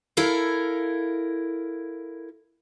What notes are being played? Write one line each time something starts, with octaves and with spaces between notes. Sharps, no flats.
E4 A4 A#4 F5